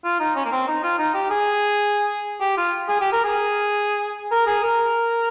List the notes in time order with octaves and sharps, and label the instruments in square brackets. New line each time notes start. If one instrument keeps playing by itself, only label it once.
[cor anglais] F4
D#4
C#4
A#3
C4
D#4
F4
D#4
G4
G#4
G4
F4
G#4
G4
A#4
G#4
A#4
G#4
A#4